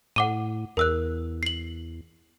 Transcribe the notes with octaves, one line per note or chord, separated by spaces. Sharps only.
A2 F#5 D6 D#7
E2 A#4 E6 F#6
C7 F#7